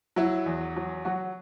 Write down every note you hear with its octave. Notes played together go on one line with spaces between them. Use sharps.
F#3 E4
E2
F#3
F#3 F#4